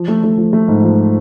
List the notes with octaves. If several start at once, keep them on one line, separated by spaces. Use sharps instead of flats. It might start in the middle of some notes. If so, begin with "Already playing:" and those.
Already playing: F3
A3
A3
F3
A3
G#2
F3